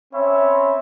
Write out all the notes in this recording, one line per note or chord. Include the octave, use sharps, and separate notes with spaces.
C4 C#4 C#5 E5 B5